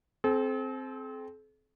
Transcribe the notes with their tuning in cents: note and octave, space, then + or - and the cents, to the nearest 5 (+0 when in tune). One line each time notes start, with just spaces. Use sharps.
C4 +0 A4 -45